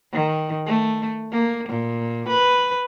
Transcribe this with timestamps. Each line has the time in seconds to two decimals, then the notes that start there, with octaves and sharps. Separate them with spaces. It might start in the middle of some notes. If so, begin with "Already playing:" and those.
0.13 D#3
0.66 A3
1.32 A#3
1.69 A#2
2.29 B4